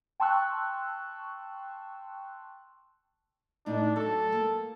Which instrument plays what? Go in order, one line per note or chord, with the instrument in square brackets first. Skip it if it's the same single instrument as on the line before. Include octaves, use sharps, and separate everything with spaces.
[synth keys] G5 A5 C6 C#6 E6 F#6
[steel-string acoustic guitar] A2 D#4 [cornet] D4
[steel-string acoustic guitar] F#3 [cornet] A4
[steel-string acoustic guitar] A#3